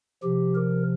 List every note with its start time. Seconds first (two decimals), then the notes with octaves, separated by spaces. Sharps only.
0.23 C3 F3 G4
0.55 A#4